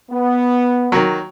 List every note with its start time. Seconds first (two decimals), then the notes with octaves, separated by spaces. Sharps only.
0.11 B3
0.92 D#3 F#3